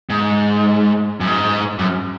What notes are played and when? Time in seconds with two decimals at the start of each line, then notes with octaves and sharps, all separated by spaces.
0.10 G#2
1.20 F#2
1.27 G#2
1.79 F#2